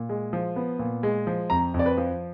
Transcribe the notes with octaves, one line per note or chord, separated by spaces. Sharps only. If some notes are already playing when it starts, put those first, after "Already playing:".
Already playing: A#2
G#3
F3
B3
A#2
G#3
F3
F2 A#5
F2
D5
B4
F3